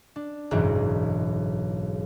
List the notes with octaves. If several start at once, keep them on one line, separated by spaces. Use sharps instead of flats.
D4
F#1 B1 G#2 E3